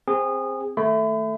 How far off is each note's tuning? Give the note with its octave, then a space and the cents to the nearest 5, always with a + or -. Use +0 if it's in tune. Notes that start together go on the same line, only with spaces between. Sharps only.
C4 +0 G#4 -20
D#3 +0 A3 +0 B5 +40